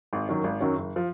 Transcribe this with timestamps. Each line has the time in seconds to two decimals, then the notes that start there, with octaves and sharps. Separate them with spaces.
0.13 G#1
0.29 F#2 D#3 F#3 C#4
0.44 G#1
0.60 F#2 D#3 F#3 C#4
0.76 F#1
0.96 F3